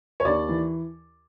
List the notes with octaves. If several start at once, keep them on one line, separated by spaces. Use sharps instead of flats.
C#5
D#2 D5
E3